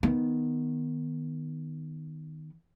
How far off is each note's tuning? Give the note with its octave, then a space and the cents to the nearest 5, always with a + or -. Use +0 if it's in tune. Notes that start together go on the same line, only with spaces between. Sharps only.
D#3 +0 B3 +0